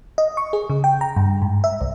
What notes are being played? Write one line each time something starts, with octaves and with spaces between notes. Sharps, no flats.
D#5
C#6
G#4
C#3
G5
A#5
G2
G#2
E5
C2